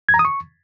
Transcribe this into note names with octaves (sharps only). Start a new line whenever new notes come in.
G#6
A#5
D#6
C#6